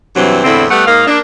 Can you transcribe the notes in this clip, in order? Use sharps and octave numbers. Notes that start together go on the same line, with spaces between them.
G2 C3 E3 F#3 C4
E2 A2 D3 C4 E4
G3 A3 B3 F#5
G#2 A#3 D#5 F5
A#3 D4